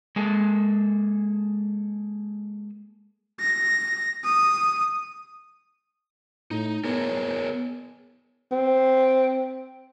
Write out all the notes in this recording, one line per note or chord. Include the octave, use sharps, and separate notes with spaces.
G#3 A#3 G#4 A4
A#6
D#6
A2 D#4
B3 G#4 A#4 C#5
C4